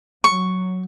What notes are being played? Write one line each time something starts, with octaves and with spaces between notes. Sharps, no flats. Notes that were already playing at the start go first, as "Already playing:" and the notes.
F#3 C#6